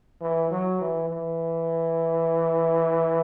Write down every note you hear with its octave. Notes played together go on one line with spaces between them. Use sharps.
E3
F#3
E3
E3